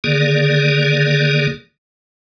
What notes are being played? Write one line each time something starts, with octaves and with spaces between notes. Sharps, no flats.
D3 D#3 A#3 G#4 D5